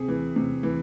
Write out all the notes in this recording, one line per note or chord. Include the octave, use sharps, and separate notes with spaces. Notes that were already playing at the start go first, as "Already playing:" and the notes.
Already playing: C3 G#4
E3
C3
E3